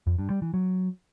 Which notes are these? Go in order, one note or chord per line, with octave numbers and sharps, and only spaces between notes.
F2
G2
G3
E3
F#3